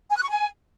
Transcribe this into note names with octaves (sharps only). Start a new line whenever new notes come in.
G#5
F#6
C#6
G#5